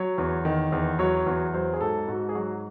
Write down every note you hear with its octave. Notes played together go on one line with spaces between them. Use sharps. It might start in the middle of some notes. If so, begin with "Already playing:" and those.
Already playing: F#3 C#5
E2
D#3
E2
F#3 C#5
E2
F#3 C5
G#4
G#2 A4
G#2 F#4
G#4
F#3 F#4